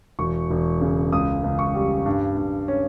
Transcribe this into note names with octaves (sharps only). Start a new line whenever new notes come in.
E1 C#6
E1
C#3
C#2 D#6
C#2
C#6
G3
G2
G2
C#4